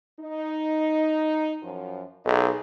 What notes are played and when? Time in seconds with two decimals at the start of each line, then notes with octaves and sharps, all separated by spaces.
0.19 D#4
1.63 F#2 F3
2.25 B1 D#4 G#4